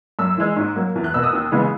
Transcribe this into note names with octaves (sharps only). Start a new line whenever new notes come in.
F#2 E6
E3 G#3
G#2
F#3 A#3
E2
F#6
B2 A#3 E6
D#6
D#2
C#3 E3 G#3 B3